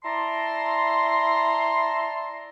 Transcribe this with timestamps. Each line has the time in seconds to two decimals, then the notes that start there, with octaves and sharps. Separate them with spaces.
0.03 E4 D5 A5 A#5 C6